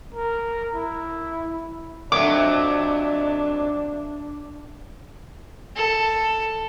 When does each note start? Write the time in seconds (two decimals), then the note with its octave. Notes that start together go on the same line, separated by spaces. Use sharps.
0.14 A#4
0.74 E4
2.12 F2 F#3 A3 D4 D6
5.76 A4